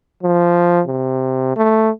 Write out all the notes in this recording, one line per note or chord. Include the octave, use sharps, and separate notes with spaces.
F3
C3
A3